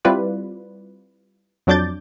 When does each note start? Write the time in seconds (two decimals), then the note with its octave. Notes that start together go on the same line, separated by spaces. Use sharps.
0.05 G3 C4 E4 F4 B4 D5
1.67 F2 F#3 D4 D6 G6 A6